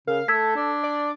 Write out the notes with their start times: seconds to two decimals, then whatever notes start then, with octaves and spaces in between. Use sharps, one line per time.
0.08 C#3 A#4 F5
0.28 A3 A4 E6 G#6 B6
0.56 D4
0.83 D5